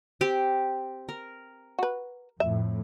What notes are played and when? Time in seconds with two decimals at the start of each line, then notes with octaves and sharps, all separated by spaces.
0.21 C4 G4
1.09 A#4
1.79 F#4 B4
2.40 F2 A2 E5